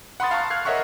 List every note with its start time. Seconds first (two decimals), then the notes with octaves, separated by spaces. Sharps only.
0.20 F#5 B5 C6 D#6 A6
0.31 F5 A5 A#5 C#6
0.50 F6 F#6 G#6 C7
0.65 A#4 C#5 D#5 E5 F#5 C#6